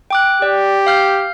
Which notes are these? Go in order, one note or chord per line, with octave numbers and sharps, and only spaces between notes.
G5 D6 F#6
G4 D5
F5 F6 G6